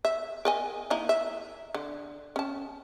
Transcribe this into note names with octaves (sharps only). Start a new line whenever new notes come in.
E5
A#4 D#5 G#5
A#3 D#4 E4
E5
D3
C#4 A5